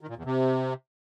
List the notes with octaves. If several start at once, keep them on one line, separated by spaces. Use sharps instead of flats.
D#3
A#2
E2
C3